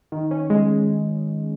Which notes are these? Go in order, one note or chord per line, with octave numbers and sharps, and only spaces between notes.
D#3
C#4
G#3